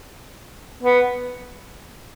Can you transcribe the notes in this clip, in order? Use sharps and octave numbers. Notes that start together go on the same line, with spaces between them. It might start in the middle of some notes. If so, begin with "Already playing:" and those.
B3